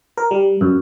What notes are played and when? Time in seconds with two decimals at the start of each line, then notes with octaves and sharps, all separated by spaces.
0.17 A#4
0.31 G3
0.61 F#2